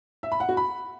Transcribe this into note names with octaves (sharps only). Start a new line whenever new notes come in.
E5
B5
F#5
F#4
B5